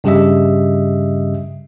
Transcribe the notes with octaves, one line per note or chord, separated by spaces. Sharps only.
G2 C#3 G3 G4 D#5 E5